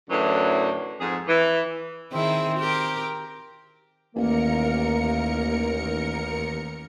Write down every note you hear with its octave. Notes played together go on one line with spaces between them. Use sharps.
F#2 A2 D3 E3 F#3
F2 G#2 G#4
E3
D#3 C4 E4 G#4
G4 A#4
A1 D#2 A#3 A#4 C#7